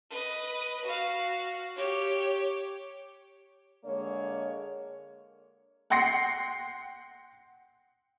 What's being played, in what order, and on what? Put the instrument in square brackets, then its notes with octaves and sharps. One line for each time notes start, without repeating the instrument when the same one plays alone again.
[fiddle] B4 D#5
F#4 F5
G4 C#5
[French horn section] D3 G#3 A#3 C#5
[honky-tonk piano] F#5 G5 C6 A#6 C7 C#7